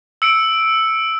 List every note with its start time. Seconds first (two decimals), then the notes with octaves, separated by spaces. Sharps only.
0.22 E6 C#7 D7